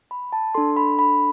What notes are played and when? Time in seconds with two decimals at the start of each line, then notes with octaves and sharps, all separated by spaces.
0.11 B5
0.33 A5
0.54 D4 A4 C6
0.77 B5
0.99 B5